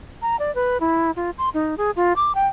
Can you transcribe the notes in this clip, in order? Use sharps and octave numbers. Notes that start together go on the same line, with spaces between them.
A#5
D5
B4
E4
F4
C6
D#4
G#4
F4
D6
G5